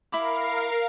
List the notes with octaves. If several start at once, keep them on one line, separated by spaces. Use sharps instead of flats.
E4 A#4 F5 B5 D6 C7